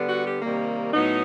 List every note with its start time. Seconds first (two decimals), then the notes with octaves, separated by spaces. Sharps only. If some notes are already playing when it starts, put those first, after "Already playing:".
Already playing: D3 G3 B3 D4
0.09 F#4
0.26 G4
0.42 C3 D#3 G3 A#3
0.93 A2 F#3 B3 D#4